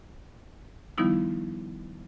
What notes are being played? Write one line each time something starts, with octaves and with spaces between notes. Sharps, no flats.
D#3 F3 G3 B3 D#4 E4